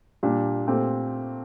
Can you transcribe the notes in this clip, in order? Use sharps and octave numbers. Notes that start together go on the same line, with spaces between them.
A#2 G3 D4
A#2 A3 C4 G4